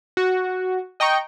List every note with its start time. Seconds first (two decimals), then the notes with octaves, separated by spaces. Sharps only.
0.17 F#4
1.00 D#5 G5 A#5 C#6